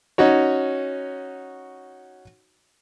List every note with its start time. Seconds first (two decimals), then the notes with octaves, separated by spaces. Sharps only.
0.18 C#4 D#4 F#4 C#5